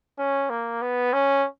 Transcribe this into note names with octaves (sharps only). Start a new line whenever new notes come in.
C#4
A#3
B3
C#4